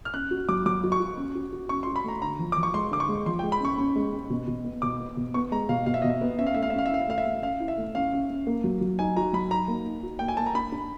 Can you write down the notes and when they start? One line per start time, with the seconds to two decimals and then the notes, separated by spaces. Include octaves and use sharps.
0.05 F6
0.14 C#4 F#6
0.31 F#4
0.49 F#3 D6
0.66 F#3 D6
0.83 F#4
0.92 C#6
1.00 F#4
1.17 C#4
1.35 F#4
1.53 F#4
1.69 C#4 C#6
1.83 C6
1.87 F#4
1.96 B5
2.04 A3 A#5
2.22 D3 A#5
2.39 F3
2.52 F3 D6
2.63 C#6
2.74 G#3 C6
2.91 D3 D6
3.00 C#6
3.09 G#3
3.26 F3 C6
3.39 G5
3.43 G#3
3.52 B5
3.61 C#4 C#6
3.78 C#4
3.96 G#3
4.13 C#4
4.30 B2
4.48 B2
4.65 B3
4.82 B2 D6
5.00 B3
5.17 B2
5.34 B3 C#6
5.52 G#3 A#5
5.69 B2 F5
5.86 B2 F5
5.94 E5
6.02 B2 D#5
6.10 E5
6.21 B3
6.39 C#4 E5
6.46 F5
6.54 A3 E5
6.63 F5
6.70 E5
6.73 C#4
6.78 F5
6.86 E5
6.90 E4 F5
7.02 E5
7.08 A3 F5
7.18 E5
7.25 A3
7.42 C#4 F5
7.60 E4
7.68 E5
7.77 A3
7.95 C#4 F5
8.12 C#4
8.30 C#4
8.47 A#3
8.64 F#3
8.81 F#3
8.99 D#4 G#5
9.17 F#4 A#5
9.33 F#3 B5
9.51 D#4 A#5
9.68 A#3
9.86 D#4
10.03 F#4
10.19 A#3 G5
10.28 G#5
10.37 A#3 A5
10.46 A#5
10.55 D4 B5
10.72 D4